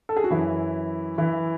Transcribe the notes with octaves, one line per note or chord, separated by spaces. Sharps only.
A4
G#4
F#4
F#2 E3 E4
E3 E4